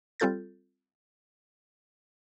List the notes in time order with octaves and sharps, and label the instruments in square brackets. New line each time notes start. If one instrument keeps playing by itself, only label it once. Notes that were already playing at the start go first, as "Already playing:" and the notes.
[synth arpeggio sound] G3 C4 F4 A4 G6 A6